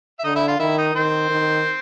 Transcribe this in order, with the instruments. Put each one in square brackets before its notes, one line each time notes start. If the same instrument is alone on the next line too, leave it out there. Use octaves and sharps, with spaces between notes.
[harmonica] E5
[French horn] D3 [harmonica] D#4 D#5
[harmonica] E4 E5
F4 F5
[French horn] D#3 [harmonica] E4 E5
[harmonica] D#4 D#5
[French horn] D#3 [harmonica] C4 C5
[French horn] D#3